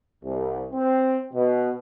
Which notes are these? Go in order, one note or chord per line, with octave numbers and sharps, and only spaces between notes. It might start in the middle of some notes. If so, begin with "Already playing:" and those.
C2
C4
B2